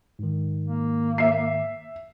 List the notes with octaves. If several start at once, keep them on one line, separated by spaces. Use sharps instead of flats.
G#2 D#3
A#3
E5 C7